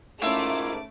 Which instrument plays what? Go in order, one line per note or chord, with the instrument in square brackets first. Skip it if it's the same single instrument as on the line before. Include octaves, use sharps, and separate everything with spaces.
[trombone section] G#2 A#4 [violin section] A3 D6 [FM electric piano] C#4 B5 [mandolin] E4 F4